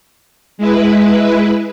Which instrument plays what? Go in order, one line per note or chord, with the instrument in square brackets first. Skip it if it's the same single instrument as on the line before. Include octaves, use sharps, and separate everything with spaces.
[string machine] G#3 E4 B4